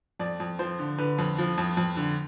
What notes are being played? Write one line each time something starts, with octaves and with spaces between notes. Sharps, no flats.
F2 D5
F2
F3 C5
D3
D3 B4
F2
F3
F2
F2
D3